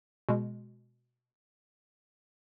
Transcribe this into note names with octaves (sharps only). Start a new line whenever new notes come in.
B2 G#3